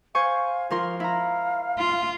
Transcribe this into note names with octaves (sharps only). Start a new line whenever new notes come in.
C5 F5 G#5 C#6
F3 F4 A#4 C6
E4 F5 A#5
F4